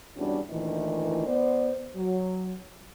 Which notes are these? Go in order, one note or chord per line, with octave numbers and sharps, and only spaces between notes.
E2 G#2 G3 C#4 D4 F#4
D2 A#2 D#3 E3
B3 C5 D5
F#3